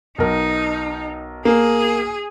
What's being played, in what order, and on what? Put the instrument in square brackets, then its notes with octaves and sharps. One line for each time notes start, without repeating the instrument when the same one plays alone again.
[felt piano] B1 A#4 [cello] D#4
[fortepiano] A#3 [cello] G#4